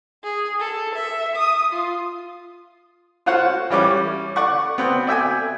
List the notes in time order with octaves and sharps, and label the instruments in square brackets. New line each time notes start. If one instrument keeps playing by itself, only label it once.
[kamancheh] G#4
A4
E5
D#6
F4
[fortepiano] F4 F#4 C5 C#5 F#5
E3 G3 C#4 D6
D5 F#5 C#6
B3 C4
D5 E5 G5 G#5